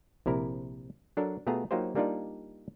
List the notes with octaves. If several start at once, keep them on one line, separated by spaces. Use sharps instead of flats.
A#1 C3 E4 A#4
F#3 D4 A4 A#4
B2 A3 B3 F4 G#4 A#5
F#3 A#3 D#4 F4 G4 C5
G3 A#3 D4 D#4 F4 D5